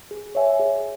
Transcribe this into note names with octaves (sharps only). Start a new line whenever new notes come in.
G#4
C#5 E5 G#5
G#4